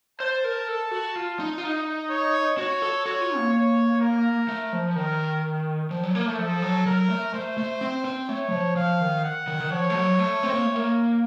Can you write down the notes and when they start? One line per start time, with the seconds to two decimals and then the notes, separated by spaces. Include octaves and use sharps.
0.20 C5 A5
0.44 A#4
0.68 A4
0.91 F#4
1.16 F4
1.40 D#4
1.58 F4
1.63 D#4
2.10 C#5
2.58 F#4 C#5
2.82 A4
3.06 F#4 C#5
3.21 F4
3.37 A#3
3.53 C#5
4.01 A#4
4.48 A3
4.73 F3
4.95 D#3 A#4
5.91 F3
6.04 F#3
6.15 A#3
6.26 A3
6.38 F3 A4
6.62 F#3
6.86 F#3 A#4
7.10 A3
7.34 A3 C5
7.58 A3
7.81 C4
8.05 C4
8.29 A3 C#5
8.48 F#3
8.52 F3
8.76 F3 F5
9.00 D#3
9.24 F#5
9.48 D#3
9.60 D#3
9.71 F3 C#5
9.90 A3
9.95 F#3
10.19 A3
10.43 C4
10.54 A#3
10.65 A3
10.76 A#3